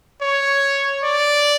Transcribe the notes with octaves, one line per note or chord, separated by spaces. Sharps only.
C#5
D5